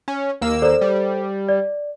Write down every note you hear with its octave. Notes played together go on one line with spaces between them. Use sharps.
C#4
D#2 A#3 E6
A4 C5 D5
G3
D5